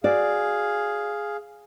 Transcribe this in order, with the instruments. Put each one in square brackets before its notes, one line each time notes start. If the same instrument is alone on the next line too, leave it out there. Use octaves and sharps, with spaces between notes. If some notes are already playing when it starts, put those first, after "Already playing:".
[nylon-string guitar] F#4 D5 [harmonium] G#4 F5